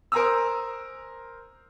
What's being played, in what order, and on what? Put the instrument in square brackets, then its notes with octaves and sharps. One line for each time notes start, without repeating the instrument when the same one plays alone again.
[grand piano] A#4 C5 G#5 A#5 D#6 E6